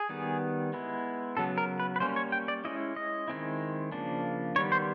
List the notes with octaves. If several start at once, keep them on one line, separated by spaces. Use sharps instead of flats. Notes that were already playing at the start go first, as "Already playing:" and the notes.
Already playing: G#4
D#3 G3 B3
G#3 B3 E4
C#3 F#3 B3 A4
A#4
B4
B4
G3 A#3 C#4 C5
C#5
G5
D5
G#3 C#4 E4 D#5
D#5
D#3 G#3 C4 E4
C#3 F3 A#3 D4
D#3 G3 B3 C#5
C5